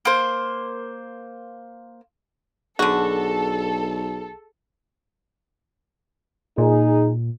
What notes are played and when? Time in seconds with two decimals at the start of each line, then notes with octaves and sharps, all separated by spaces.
0.05 A#3 C5
2.79 B1 D3 F#4 G#4 A4
6.58 A#2 D#4 G#4